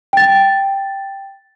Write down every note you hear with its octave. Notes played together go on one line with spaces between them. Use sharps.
G5 A6